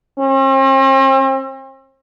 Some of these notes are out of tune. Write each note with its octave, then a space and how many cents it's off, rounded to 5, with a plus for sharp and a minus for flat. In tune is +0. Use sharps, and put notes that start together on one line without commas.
C4 +45